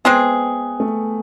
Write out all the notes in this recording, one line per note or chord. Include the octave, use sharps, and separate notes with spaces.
G#3 B3 C4 G#4
A3